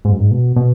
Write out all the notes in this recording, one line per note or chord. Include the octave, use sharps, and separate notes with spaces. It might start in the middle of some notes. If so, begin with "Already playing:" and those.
G#2
F#2
G#2
B2
B2